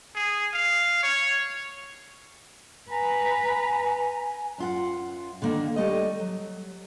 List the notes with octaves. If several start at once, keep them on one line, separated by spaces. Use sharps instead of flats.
G#4
F5
C#5
B4 G#5 A#5
F#2 F4 F#5
D3 D#3 A#3
G3 A3 D#5
F#3